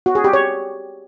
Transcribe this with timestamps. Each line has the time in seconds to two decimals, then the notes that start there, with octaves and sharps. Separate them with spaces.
0.06 F#4
0.15 G#4
0.24 G4
0.33 C#5